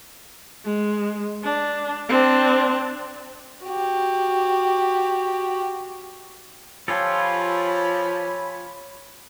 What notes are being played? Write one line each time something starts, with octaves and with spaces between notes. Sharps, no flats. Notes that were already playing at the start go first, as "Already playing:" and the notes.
G#3
D4
C4 D4
F#4 G4
F3 F4 G4 A4 C#5 G#5 B5